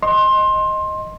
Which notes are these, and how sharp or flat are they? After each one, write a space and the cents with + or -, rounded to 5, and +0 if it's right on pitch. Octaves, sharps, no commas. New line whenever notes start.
D#5 +0 C6 +20